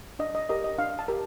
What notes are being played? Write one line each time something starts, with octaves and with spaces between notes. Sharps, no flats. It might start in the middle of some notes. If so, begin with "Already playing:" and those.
D4 D#5
D#5
G4 A#4 D#5
D#5
D4 F5
A5
G4 A#4